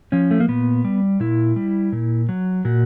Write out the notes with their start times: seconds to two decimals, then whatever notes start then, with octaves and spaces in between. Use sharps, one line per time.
0.12 F3 C#4
0.31 A3
0.40 A#3
0.48 A#2 B3
0.85 G3
1.20 A#2 E4
1.56 G3
1.92 A#2
2.29 F#3
2.65 A#2 F#4